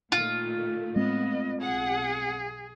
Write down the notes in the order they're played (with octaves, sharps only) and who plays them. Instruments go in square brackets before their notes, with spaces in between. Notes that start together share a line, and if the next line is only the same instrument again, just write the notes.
[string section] A#2 D#3 A3 [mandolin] F4
[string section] A2 B3 [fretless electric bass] G#3 C4 [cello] D#5
[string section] B1 F#5 [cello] G#4